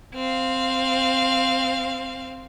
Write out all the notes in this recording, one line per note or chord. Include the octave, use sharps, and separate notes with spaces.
C4 F5